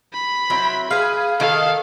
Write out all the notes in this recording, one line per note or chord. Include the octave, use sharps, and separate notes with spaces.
B5
F#3 C4 E4
G#4 B4 F5
D#3 A4 F5